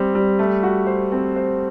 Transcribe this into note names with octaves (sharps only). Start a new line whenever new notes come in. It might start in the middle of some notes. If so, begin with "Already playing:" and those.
Already playing: G3 C4
G3
A3
F#4
C5
C4
C5